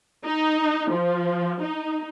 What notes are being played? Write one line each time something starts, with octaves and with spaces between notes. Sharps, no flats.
D#4
F3
D#4